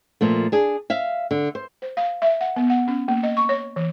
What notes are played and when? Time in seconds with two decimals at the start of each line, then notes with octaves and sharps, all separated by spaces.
0.21 A#2 F3 A3
0.52 D4 G#4
0.90 E5 F5
1.31 D3
1.55 C5
1.82 C5
1.97 F5
2.22 E5
2.41 F#5
2.56 B3
2.70 F#5
2.88 C#4
3.08 A#3
3.23 D#5
3.37 C#6
3.49 C#5
3.76 E3